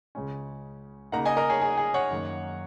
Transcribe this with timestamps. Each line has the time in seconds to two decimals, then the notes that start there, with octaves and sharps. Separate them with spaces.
0.15 C#2 C#3 G#3 C#4
1.12 C#3 A#3 D#4 F#5 A#5
1.25 D#5 G#5
1.37 A#4 D#5
1.50 G#4 C#5
1.62 G#4
1.77 G#4
1.94 C#5 F#5
2.10 F#2 D#3 A#3